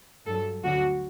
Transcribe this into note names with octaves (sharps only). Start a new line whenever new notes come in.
G2 F#3 A4
D2 D3 F#3 F#4